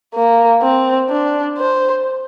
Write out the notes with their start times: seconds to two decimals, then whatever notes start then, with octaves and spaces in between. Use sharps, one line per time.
0.15 A#3
0.62 C4
1.10 D4
1.58 C5